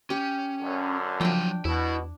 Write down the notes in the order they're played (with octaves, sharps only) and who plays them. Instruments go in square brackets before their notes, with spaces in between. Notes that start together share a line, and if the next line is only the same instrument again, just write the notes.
[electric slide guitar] C#4 [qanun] G4
[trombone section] F#2 D3
[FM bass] F3 [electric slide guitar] F#3 F5 [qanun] D4 G5
[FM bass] E2 [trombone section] B2 [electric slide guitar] E4